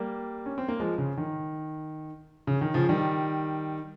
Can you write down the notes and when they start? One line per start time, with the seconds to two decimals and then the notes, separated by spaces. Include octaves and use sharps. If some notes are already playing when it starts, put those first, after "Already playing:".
Already playing: G3 A#3
0.46 C#4
0.58 C4
0.68 A#3
0.80 F3 G#3
0.98 C#3
1.17 D#3
2.47 C#3
2.61 D#3
2.74 C#3 F3
2.89 D#3 G3